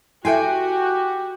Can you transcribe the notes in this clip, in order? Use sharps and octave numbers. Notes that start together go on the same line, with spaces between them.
E4 F#4 G4 A4 E5 G5 G#5